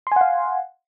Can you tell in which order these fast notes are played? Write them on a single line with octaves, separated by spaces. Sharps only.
C6 G#5 F#5 F5